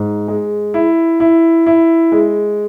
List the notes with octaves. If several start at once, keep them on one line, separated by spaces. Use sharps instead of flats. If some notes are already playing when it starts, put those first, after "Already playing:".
Already playing: G#2
G#3
E4
E4
E4
G#3